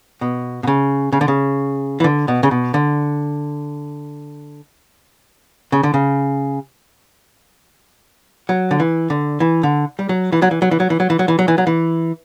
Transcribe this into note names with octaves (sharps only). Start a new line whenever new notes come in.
B2
B2
C#3
C#3
D3
C#3
E3
D3
B2
C#3
B2
D3
C#3
D3
C#3
F#3
D3
E3
D3
E3
D3
G3
F#3
E3
F#3
E3
F#3
E3
F#3
E3
F#3
E3
F#3
E3
F#3
E3
F#3
E3